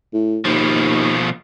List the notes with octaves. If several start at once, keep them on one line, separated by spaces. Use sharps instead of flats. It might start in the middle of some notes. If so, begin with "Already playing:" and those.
A2
D#2 B2 F3